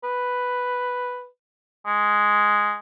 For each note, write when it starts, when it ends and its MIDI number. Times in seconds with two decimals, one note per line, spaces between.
0.04 1.26 71
1.87 2.78 56